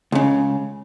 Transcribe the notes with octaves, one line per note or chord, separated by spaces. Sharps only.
C#2 C#3